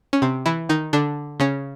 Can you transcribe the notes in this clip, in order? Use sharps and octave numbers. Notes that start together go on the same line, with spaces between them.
C#4
C3 C4
E3 E4
D#3 D#4
D3 D4
C#3 C#4